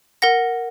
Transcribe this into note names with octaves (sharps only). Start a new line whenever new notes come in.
A#4 F#5 A#6